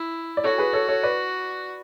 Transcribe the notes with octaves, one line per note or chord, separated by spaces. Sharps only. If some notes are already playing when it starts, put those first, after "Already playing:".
Already playing: E4
D5
F#4 A4 C#5
G#4 B4
A4 C#5
A4 C#5
B4 D5